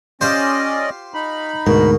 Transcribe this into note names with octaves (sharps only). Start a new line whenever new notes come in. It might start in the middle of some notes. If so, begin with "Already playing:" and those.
C#4 F4 G4 C5 D5 D#5
D#4 B5
D2 G#2 B2 A#4